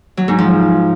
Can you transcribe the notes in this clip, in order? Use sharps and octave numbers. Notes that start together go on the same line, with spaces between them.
F#3
G#2
F3